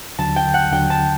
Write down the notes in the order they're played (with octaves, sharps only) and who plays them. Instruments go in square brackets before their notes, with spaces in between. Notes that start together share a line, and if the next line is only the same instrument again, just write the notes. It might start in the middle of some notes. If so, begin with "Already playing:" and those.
[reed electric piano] D#2 D3 F#3 [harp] A5
[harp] G5
F#5
[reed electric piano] D#2 D3 F#3 [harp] G5
[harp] A5